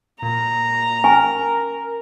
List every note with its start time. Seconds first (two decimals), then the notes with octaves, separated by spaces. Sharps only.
0.22 A#2 A#5
1.04 C#4 A#4 G#5 C#6